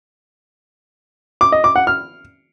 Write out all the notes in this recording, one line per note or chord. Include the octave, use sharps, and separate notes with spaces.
D6
D#5
D6
F#5
F6